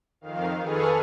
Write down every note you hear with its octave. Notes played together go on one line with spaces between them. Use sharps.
F2 D#3 F5
G#4 A4 B4 C#6 D#6 F6